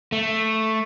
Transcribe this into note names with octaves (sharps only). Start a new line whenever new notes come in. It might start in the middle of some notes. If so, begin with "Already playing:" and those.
A3